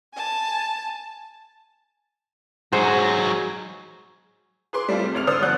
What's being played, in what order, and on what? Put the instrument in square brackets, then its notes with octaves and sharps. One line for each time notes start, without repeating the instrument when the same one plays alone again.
[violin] G#5 A5
[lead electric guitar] G#2 F#3 [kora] G#3 C5 F#5
[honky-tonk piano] G#4 B4 C6 D6
G3 A3 C4 D4 F4
C3
G#1 C#2 F6 F7
D3 B4 C5 D5 D#6 E6
G1 F3 D5 F#5 F#6 G6